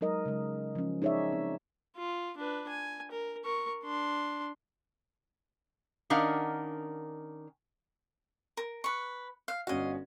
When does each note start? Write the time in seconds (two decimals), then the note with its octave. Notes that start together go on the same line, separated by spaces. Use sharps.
0.01 F#3 G#3 D#4 A#4 D#5
0.25 C#3 G#3
0.75 F3 C#4
1.02 D#4 G#4 C#5 D5 E5
1.32 C4
1.97 F4
2.37 D4 B4
2.69 G#5
3.12 A#4
3.45 A#4 C#6
3.84 D4 C6
6.10 D#3 C#4 D4 A#4 F5 F#5
8.57 A#4
8.84 B4 C#6
9.48 F5
9.67 G1 C#4 F#4 D#5 F5